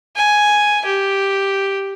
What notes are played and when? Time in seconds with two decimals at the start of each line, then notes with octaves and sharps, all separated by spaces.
0.16 G#5
0.85 G4